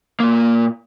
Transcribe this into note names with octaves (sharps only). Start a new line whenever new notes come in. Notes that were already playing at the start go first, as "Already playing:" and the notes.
A#2 A#3